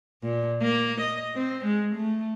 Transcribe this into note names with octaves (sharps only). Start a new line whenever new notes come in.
A#2
A#3
D#5
C4
G#3
A3